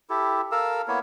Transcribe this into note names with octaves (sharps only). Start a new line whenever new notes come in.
E4 G4 A4
A4 A#4 F5 E6
A#3 B3 E4 C#5